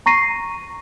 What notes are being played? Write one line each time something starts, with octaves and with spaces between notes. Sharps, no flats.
A#5 C#6 A#6 C7 D#7